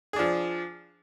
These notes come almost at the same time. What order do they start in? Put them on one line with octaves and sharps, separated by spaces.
G#4 D4 F3